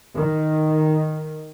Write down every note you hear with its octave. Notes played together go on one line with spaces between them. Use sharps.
D#3